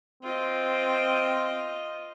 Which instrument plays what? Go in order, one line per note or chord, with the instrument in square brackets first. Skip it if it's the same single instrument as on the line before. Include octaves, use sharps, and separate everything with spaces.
[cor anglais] C4 [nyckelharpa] F4 D#5